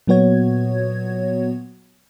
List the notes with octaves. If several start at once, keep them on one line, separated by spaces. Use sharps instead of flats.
A#2 F#3 B3 F#4 C#5 G#6